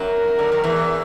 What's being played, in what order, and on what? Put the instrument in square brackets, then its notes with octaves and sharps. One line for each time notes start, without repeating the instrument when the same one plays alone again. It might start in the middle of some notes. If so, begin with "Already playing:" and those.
Already playing: [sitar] F#2 F#3 [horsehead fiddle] A#4
[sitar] D3
D#3
E2 E3